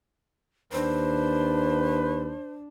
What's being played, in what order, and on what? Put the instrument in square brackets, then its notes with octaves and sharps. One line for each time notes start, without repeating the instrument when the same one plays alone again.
[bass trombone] D#2 [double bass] D4 [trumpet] B4 [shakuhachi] C5